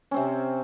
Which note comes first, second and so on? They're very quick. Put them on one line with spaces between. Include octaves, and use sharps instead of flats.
C#4 C4 C3